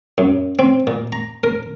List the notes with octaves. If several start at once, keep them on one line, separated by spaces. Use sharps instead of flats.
F#2
C4
A#2
A#5
A#4